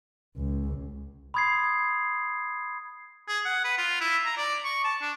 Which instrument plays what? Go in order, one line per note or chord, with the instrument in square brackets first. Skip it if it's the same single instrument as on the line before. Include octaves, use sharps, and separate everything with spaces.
[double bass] C#2
[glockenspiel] B5 C6 D#6 G#6 A6 C7
[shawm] G#4
F#5
B4
F4
E4
A#5
D5
C#6
A5
D4